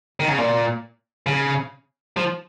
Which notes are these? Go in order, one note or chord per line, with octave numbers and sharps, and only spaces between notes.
D#3
C#3
A#2
C#3
F3